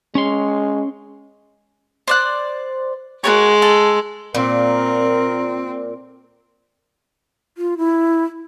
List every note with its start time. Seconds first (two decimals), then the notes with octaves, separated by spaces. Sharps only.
0.15 G#3 C#4 C#5 C6
2.07 C5 D5 F#6
3.24 G#3 F#4 A#4 C#5
3.62 A4
4.35 A#2 C4 A#4
7.58 F4
7.78 E4